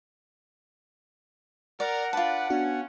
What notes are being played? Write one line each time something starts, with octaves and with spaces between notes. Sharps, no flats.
A#4 D5 F#5
D4 F4 B4 D5 A5
B3 C#4 D4 F#4